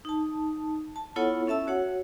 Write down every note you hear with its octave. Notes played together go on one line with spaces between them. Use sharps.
D#4 A5
A5
B3 E4 F4 A4 C#5 F#5
C#4 A4 E5 A5 E6
F#4 C#5 F#5